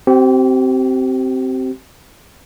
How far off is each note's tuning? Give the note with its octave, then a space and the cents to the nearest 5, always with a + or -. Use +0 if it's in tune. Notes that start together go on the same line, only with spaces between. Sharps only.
C4 +0 G4 -40